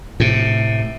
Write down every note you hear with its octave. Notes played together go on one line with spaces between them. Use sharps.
A2 C3